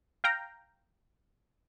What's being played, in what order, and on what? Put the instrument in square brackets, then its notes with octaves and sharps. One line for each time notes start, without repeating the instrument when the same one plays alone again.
[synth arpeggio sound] F5 G5 A#5